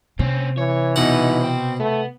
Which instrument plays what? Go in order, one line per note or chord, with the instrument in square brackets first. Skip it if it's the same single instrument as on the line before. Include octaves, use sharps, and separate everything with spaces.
[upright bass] C3 [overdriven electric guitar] C4 C#4
[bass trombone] E3 [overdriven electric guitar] C#5
[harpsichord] B2 F#5 [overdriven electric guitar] B3 D#4
[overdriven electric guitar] C5 G5
[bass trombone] A3 [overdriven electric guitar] B3